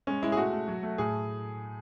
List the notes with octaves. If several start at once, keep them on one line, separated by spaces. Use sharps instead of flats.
G#3 C#4
G#3 E4
G#4
A3 F#4
A3
F#3
A3
A2 G#4